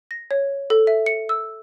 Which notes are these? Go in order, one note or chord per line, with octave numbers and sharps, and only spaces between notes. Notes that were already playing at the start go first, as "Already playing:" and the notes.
A#6
C#5
A4
E5
C#7
E6